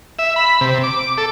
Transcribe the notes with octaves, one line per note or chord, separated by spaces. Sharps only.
E5
B5
C3
D6
A4